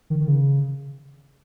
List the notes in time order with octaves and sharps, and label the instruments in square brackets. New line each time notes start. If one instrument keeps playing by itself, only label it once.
[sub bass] D#3
D#3
C#3